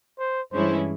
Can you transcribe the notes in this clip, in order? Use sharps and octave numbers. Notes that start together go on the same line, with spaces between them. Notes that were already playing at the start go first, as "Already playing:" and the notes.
C5
G2 E3 G#3 C#4 E4 C5